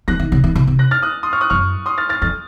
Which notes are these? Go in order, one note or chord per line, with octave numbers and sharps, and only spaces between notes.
F3 F#6 A#6
D#3
C#3
D#3
C#3
C3
F#6 A#6
F6 A6
D#6 F#6
C6 D#6
C#6 F6
D#6 F#6
F#2 C#6 F6
C6 D#6
F6 A6
F6 A6
F2 F6 A6